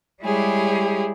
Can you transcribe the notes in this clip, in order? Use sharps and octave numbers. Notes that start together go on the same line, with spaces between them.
G3 G#3 E4 G4 G#4 C#5